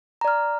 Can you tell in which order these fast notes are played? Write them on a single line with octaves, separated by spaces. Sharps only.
A#5 D5 F6